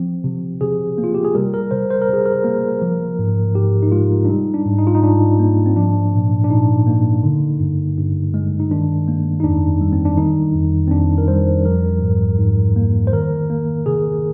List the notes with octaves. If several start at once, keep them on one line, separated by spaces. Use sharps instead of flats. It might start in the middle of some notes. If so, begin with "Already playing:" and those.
Already playing: F3 C4
C3
C3 G#4
A#3
F4
G4
G#4
G3 A#4
A#4
C3 C5
C5
A#4
C3 G#4
A#4
A#3
F3
G#2
G#2 G4
D#4
G#3 F4
D4
G3 D#4
D4
G#2
D#4
F4
D#4
G#2 D4
A#3
C4
F3 D4
A#2
D4
A#2 D#4
A#3
D3
G2
G2
G#3
D#4
D#3 D4
A#3
D#4
F2 D4
G3
C4
D4
D#3 D#4
F2
C4
F2 D4
A#4
G3 C5
F3 A#4
G#2
G#2
A#3
C5
D#3 A#4
A#3
C3 G#4